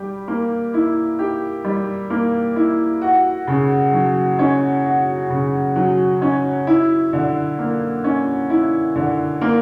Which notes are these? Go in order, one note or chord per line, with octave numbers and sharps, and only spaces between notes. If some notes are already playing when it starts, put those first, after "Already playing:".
Already playing: G3 G4
A#3
E4
G4
G3
A#3
E4
F#4
C#3
F#3
C#4
F#4
C#3
F#3
C#4
E4
D3
A#3
C#4
E4
D3
A#3